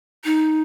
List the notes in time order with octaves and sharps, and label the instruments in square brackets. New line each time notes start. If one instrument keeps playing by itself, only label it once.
[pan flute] D#4